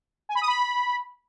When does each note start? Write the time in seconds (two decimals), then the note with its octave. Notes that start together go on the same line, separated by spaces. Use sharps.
0.29 G#5
0.35 B5
0.41 D#6
0.48 B5